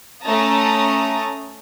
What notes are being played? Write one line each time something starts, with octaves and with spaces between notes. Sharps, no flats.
A3 C#4 A5 A#5 D#6